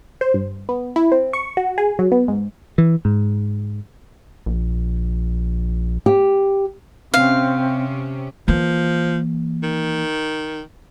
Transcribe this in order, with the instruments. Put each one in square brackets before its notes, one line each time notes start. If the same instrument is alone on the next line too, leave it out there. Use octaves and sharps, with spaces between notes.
[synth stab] C5
G2
B3
E4
C4
C#6
F#4
G#4
F#3
B3
G#2
[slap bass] E3
G#2
[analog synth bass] A#1
[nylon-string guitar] G4
[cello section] C3 C#4 [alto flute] C4 [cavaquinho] F5
[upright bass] E3 A#3 [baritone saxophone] F3
[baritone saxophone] D#3